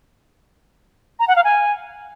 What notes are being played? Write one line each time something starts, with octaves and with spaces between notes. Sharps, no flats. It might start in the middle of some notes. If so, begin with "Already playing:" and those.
A#5
F#5
F5
G#5